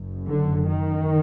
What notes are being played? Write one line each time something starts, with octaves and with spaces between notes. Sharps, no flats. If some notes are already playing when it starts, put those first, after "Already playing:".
Already playing: F#1 F#2
D3
D#3